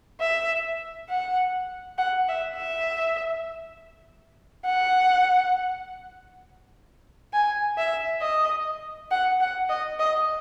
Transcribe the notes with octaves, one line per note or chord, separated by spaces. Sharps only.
E5
F#5
F#5
E5
E5
F#5
G#5
E5
D#5
F#5
F#5
D#5
D#5